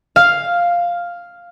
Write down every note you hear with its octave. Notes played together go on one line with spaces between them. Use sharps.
F5